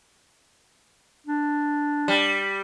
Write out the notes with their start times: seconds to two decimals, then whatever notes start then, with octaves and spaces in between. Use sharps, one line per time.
1.27 D4
2.08 G3